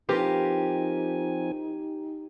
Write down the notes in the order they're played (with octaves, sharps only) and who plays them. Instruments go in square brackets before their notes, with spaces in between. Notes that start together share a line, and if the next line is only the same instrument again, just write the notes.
[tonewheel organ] F3 C4 G#5 [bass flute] D#4 [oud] F4 A#4 B4 [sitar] G4